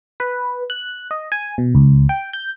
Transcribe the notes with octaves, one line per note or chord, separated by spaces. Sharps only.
B4
F#6
D#5
G#5
B2
C#2
G5
G6